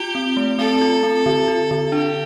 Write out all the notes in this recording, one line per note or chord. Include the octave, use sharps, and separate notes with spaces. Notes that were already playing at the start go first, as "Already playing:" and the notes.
Already playing: F4 G4
C4
A3
C4 A4
F4
C4
D3
F4
D3
D4 G4